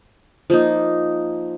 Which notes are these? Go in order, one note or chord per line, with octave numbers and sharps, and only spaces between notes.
F3 A#3 D#4